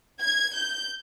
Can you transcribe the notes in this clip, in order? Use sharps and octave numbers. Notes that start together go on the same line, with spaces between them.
G#6
G6